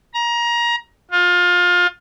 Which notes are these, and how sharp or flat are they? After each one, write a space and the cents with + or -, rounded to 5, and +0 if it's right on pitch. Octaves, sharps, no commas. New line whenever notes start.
A#5 +25
F4 +25